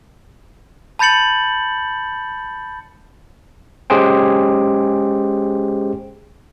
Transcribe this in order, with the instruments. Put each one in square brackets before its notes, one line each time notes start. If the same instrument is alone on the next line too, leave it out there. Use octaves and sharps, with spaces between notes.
[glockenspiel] A5 B5 G6 A6 C#7 F#7
[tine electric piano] G#3 C#4 G4 G#4 C5 G5